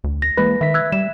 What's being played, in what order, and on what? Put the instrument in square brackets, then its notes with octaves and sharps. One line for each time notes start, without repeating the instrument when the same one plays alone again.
[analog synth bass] D2
[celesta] A#6
[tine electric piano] E3 A#3 [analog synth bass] G#3 [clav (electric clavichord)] B4
[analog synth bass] D#3 [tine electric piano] E5 B6
[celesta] E6 F#6 G#6
[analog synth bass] G3 [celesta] E7